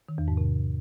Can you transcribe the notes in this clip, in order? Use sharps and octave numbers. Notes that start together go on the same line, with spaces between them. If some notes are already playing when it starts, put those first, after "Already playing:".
D#3
E2
G#2
C3